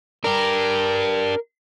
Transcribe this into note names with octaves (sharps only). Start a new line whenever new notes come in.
D4 G4 A#4